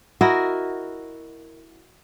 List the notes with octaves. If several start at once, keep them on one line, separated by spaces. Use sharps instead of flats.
E4 F#4 A#4 D#5